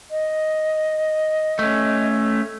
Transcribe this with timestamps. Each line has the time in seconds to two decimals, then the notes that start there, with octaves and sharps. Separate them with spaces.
0.11 D#5
1.59 A3 C#4